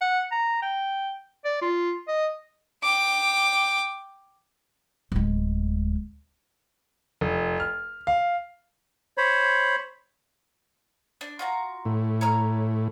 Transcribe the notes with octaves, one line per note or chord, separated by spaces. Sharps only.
F#5
A#5
G5
D5
F4
D#5
G5 D6
D1 G#3
F1
F6
F5
C5 C#5 B5
D4
F4 F#4 A#5
A2
C#5 A#5 F6